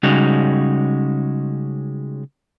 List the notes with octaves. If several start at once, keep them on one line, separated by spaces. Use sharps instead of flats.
C#3 G3 G#3 C#4 D#4 F#4